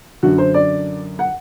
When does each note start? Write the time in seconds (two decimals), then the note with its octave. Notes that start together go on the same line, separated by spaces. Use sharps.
0.23 F#2 D3 F#4
0.38 C5
0.54 D5
1.19 F#5